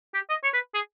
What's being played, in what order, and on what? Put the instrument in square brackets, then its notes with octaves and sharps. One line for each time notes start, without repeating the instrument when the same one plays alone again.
[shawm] G4
D#5
C#5
B4
G#4